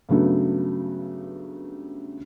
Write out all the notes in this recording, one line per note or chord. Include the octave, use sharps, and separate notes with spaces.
G2 C#3 F#3 A3 B3